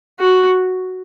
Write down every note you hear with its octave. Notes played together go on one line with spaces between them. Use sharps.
F#4